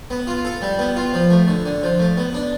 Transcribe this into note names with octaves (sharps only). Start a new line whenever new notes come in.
B3
F4
A4
G3
B3
F4
F3
A3
D3
D3
F3
A3
B3
D4